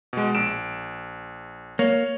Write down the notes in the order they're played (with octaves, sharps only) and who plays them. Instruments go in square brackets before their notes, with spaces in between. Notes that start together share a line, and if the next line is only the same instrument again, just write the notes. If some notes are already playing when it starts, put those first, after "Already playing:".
[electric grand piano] B2 G#3
A#1 D7 E7
[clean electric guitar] A#3 [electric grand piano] C#5